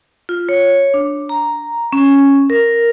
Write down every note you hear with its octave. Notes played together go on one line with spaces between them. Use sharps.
F4
C#5
D4
A#5
C#4
A#4